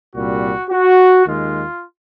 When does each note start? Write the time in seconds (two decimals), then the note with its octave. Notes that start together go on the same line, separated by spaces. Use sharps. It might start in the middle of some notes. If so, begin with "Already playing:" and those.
0.14 C2 A#2 G3 F#4
0.70 F#4
1.25 D#2 D#3 G#3 F4